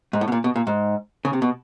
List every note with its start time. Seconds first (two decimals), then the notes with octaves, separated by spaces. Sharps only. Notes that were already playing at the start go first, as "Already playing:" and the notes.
0.13 G#2
0.21 A2
0.28 B2
0.32 A#2
0.44 B2
0.56 A#2
0.67 G#2
1.25 C#3
1.33 C3
1.42 B2